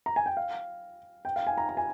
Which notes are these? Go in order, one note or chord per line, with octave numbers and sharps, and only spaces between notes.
A#5
G#5
G5
F5
G5
F5
G#5
A#5
A#5
G#5